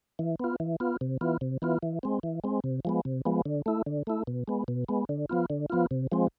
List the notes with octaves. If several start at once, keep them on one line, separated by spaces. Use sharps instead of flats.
E3
B3 F4
E3
B3 F4
C3
E3 B3 F4
C3
E3 B3 F4
E3
G#3 C4
E3
G#3 C4
C3
F3 G#3 B3
C3
F3 G#3 B3
D3
A3 E4
D3
A3 E4
B2
G#3 B3
B2
G#3 B3
D3
F3 B3 F4
D3
F3 B3 F4
C3
F3 G#3 C4